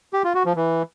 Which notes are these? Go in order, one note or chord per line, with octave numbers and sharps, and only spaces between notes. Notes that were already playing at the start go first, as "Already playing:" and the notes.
G4
F4
F#4
F3
E3